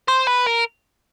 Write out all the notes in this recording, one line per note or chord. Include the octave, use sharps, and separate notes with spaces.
C5
B4
A#4